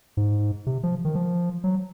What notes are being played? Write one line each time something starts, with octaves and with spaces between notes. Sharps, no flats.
G#2
C3
F3
D#3
F3
F#3